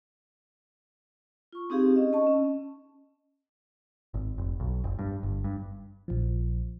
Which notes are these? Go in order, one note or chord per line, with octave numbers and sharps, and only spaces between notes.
F4 C#6
C4 D#4 G4 G#4 F5
C#4 D#5
D#5 A5 C#6
C#4
G#1
F1
B1
F#1
G2
G1
G2
A#1 F3